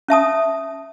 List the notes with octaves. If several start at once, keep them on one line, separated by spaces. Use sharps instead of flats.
C#4 E5 A5 D#6